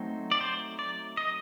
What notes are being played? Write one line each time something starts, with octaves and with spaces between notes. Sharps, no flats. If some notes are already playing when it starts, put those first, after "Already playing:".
Already playing: F#3 A3 C4 D#4
D5
C5
D5
D#5